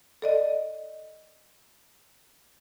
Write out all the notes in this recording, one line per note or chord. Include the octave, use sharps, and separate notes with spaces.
A4 D5 D#5